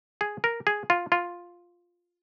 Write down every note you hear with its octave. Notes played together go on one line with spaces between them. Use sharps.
G#4
A#4
G#4
F4
F4